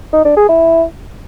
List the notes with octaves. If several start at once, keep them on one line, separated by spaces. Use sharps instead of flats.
D#4
D4
G#4
E4